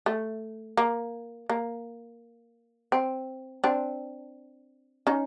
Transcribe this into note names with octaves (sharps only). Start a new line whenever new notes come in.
A3
A#3
A#3
C4
C4 D4
C#4 D#4